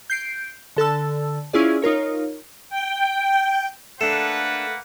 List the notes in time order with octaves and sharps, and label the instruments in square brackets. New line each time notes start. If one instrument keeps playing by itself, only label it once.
[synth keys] G6 C7 D7
D3 A4 A5 E6
C#4 E4 F4 G#4 D5
D#4 F4 A#4 C#5
[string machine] G5
[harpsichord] A3 [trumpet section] A#3 B4 F#5 [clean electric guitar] D4 A4